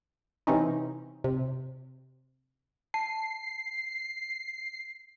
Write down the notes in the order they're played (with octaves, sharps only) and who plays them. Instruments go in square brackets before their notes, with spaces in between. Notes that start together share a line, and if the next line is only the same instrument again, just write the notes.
[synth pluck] C3 E3 C4 C#4 D#4
C3
[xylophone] A5 [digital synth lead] C7